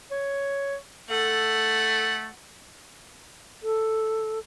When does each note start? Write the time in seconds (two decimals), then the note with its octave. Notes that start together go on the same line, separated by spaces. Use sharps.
0.11 C#5
1.10 A3 A4 F#5
3.63 A4